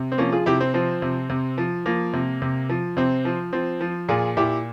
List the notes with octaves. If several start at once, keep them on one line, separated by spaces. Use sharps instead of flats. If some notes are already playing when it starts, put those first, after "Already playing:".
Already playing: C3
C4
F3 A#3 C#4
F4 G#4
C3 E4 G4
C4
F3 C4
C3
C3
F3
F3 A#3
C3
C3
F3
C3 C4
F3
F3 C4
F3
A#2 F4 G#4
A#2 E4 G4